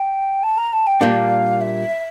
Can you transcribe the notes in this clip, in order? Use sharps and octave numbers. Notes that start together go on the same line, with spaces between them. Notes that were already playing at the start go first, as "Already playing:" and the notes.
Already playing: G5
A5
A#5
A5
G5
A#2 G3 A#3 D4 F5
E5